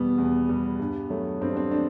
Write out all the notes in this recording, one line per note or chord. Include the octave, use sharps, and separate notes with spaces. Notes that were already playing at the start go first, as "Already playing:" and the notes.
Already playing: E2 B2 G3 B3
E2
B2 G3
G2
F#3 A3
G2 C4
D4
C4
A3 D4